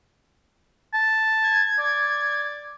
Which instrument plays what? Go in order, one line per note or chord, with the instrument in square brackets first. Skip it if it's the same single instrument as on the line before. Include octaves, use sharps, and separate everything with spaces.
[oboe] A5
[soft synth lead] G#6
[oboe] D5